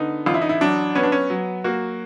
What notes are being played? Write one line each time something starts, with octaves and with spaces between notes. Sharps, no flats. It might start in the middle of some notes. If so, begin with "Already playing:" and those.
Already playing: D3 B3 D#4
A1 F4
E4
D#4
E4
F#3 D4
B3 C#4
D4
C#4
F#3
A#3 F#4